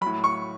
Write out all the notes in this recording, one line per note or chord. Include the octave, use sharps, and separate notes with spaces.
A2 F#3 B5
C#6